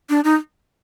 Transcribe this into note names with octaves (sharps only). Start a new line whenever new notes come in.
D4
D#4